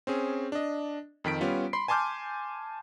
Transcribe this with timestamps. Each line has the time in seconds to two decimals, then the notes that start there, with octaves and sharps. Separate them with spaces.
0.07 C4 C#4 G#4
0.52 D4 D#5
1.24 F2 D#3 B6 D7
1.41 G3 B3 C#4 F4
1.73 B5 C6 C7
1.88 G#5 A5 C6 D6 F6 G6